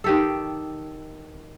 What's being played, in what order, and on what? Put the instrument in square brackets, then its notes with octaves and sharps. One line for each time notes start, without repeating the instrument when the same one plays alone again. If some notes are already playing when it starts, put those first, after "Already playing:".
[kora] D#3 G4 A4